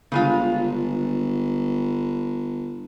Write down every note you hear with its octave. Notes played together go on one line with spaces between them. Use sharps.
G1 C#3 G#3 F4